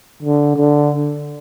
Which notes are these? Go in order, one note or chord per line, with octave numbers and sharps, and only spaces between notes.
D3
D3